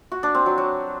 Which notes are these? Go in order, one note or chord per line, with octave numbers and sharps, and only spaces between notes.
F#4
D4
C4
F#3
F#3